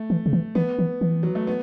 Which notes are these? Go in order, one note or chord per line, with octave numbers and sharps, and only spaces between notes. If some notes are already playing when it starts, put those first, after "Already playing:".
Already playing: A3
E3
C#3
E3
E3 B3
E3
E3
F#3
A3
B3